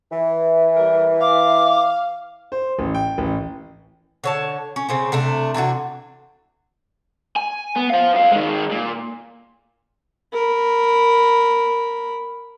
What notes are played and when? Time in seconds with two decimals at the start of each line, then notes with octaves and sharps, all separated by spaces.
0.12 E3
0.77 G3 A#4
1.21 F5 D6
2.52 C5
2.79 A1
2.95 G5
3.18 A1
4.24 D3 C#5 A5
4.76 C#4
4.89 C#3 C4 C#4
5.12 C3 A3 D4
5.54 C3 E3 D4 F#4
7.36 G#5
7.76 B3
7.90 C5 F5
8.14 F2 F5
8.32 D#3 G#3
8.71 A#2
10.33 A#4 B5